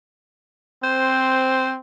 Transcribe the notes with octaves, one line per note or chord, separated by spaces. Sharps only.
C4 C5